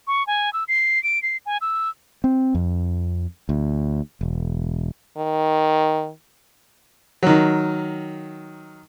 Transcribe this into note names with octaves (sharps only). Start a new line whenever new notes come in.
C#6
G#5
E6
C7
D7
C7
G#5
E6
C4
F2
D2
E1
D#3
D#3 F#3